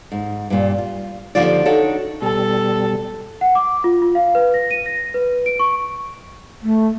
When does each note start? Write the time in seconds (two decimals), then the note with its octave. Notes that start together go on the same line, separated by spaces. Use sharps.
0.12 G#2
0.50 G2 A#2
0.78 F4
1.35 D#2 A2 D3 F3 F4 D5
1.65 D4 D#4 F#4 A4 C#5
2.22 B2 G3 A4
3.41 F#5
3.55 D6
3.84 F4
4.02 F4
4.15 F5
4.35 B4
4.54 A#6
4.71 D#7
4.86 A#6
5.14 B4
5.46 D7
5.59 C#6
6.63 A3